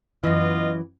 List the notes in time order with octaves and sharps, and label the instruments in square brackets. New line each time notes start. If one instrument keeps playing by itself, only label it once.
[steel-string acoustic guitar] F#2 E3 [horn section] B3 F4 D#5